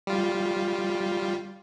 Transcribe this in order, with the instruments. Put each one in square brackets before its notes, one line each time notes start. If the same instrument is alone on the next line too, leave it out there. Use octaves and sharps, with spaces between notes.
[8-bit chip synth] G3 F4